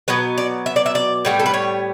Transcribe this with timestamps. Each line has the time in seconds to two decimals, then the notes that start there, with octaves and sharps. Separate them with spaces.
0.08 B2 F#3 B3 B4
0.38 D5
0.66 E5
0.76 D5
0.86 E5
0.95 D5
1.25 A2 G3 B3
1.39 A4
1.46 B4
1.54 C#5